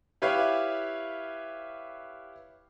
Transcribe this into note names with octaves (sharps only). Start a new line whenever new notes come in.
E4 G4 B4 C#5 E5 F5